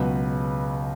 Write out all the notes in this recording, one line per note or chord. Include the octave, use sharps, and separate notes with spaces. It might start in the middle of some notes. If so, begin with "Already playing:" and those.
Already playing: C#2 B2 F#3 B4